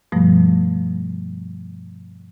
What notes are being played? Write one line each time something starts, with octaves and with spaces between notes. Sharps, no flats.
G2 B2 F3 G3 A3